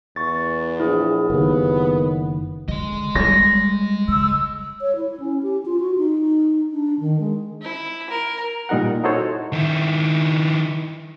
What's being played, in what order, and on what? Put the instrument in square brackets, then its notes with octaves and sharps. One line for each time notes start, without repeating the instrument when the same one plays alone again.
[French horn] E2 [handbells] C#6 A6
[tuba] A#1 [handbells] E4 G#4
[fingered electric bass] F#1 D#3 [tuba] D#2 [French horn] B3
[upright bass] D3 [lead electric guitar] G#3 D#5
[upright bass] G3 A#3 [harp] A#6
[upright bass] C#3 [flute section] E6
[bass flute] C#5
E4
C#4
G4
F4
F#4
D#4
D4
D#3
G#3
[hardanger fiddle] E4
A#4
[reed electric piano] A#2 G3 D#4 A#4 F#5
D#4 E4 F#4 A4 C5 C#5
[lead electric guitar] D#3 E4